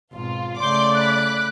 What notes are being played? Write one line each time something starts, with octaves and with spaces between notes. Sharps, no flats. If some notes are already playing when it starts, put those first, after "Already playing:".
G#1 B2 F4
C#3 A3 D5 C6 D6 G6
B5 D6 F#6